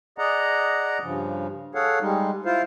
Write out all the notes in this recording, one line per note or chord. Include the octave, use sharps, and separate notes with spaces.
G#4 D5 D#5 F#5 A#5
G2 C#3 F3
G#4 A4 C#5 F5 F#5
G3 G#3 D#4
E4 F4 C5 F5